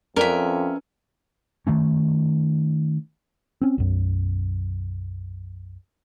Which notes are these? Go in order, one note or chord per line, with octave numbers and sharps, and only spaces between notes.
F2 C#4 A#4 B4 D5 E5
D#3 A3 C#4
C4 C#4
B1 F#2